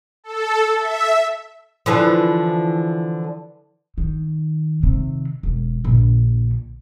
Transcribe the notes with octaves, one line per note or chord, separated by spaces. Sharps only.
A4
E5
D3 E3 F3
D#3
C3 D#3
E1
A#1 D3